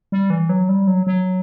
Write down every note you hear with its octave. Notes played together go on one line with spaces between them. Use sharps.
G3
E3
F#3
G3
F#3
F#3